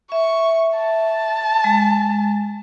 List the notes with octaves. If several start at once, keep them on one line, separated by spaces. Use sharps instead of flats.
E5 C#6
A5
G#3